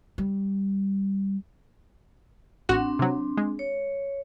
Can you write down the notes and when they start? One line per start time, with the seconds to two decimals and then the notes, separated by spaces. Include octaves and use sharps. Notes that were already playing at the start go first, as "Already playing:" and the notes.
0.18 G3
2.69 A1 C4 D4 F#4 C6
2.99 C3 F#3
3.37 G#3
3.59 C#5